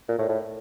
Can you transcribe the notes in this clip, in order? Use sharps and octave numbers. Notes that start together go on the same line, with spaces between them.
A#2
A2
A2